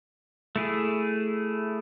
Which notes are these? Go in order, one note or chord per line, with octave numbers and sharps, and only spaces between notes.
A3 E4 G#4